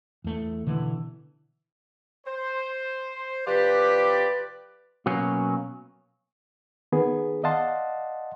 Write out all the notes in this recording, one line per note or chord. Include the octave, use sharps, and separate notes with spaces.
E2 A3
B2 D3 E3 B3
C5
C3 F3 G4 B4 D5
B2 F#3 A#3 C#4
D#3 B3 G#4
D5 D#5 F5 F#5 A5 C6